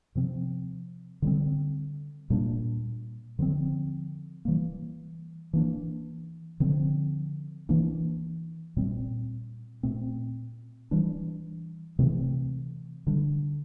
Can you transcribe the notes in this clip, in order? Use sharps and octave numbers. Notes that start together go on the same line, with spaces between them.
C3 F3 C4
D3 G3 C4
A#2 G3 A#3 D4
D3 F3 C4
E3 G3 A#3
E3 A#3 D4
D3 F3 C4
E3 A#3 D4
A#2 G3 C4
A#2 A3 C4
E3 G3 D4
C3 E3 A3 C4
D3 G3 D4